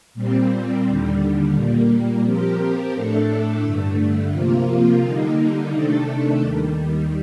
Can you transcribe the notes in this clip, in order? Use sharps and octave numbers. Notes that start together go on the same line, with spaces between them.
A#2 G3 C4
D#2 D3 G3
A#2 G3 A#3
F3 C4 G4 A#4
A2 A3 D4 A4
G2 D3 A3
C3 F3 A#3 F4
D3 G3 A#3 D#4
C3 D#3 A3 D4 A4
D#2 D#3 G3